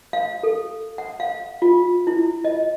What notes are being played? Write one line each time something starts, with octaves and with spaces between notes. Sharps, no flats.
F5
A4
F#5
F5
F4
E4
D#5